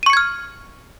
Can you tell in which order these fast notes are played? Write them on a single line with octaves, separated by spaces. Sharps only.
D#7 C#6 C#7 G#6 F6